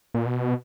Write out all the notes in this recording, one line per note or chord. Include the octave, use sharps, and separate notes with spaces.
A#2
B2